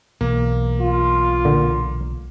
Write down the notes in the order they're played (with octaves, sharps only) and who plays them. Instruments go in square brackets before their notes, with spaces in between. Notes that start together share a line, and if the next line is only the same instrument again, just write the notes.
[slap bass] B1 E3 [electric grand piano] A#3
[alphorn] F4
[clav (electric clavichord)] A#2 D3